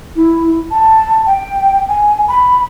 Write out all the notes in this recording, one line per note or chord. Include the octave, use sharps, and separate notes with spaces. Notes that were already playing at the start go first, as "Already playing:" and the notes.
E4
A5
G5
G#5
B5